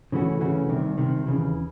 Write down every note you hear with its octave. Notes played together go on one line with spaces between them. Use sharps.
C#3 E3 A3 C#4 F#4
C#3 E3 A3 C#4 F#4
C2 C3 D#3
C2 C3 D#3
D#2 C#3 E3